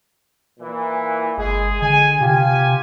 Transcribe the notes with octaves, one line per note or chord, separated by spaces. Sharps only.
A#2 E3
G1 G#3 G#4
D3 G#5
C3 F4 G4 G#5